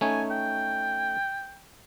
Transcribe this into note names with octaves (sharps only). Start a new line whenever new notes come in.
A3 C#4 D#4 G#5
G5